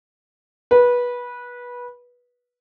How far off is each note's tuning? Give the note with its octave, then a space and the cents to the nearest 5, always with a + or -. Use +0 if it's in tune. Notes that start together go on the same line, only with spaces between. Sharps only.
B4 -20